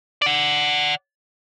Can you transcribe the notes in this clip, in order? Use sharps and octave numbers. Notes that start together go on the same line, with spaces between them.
D5 F#5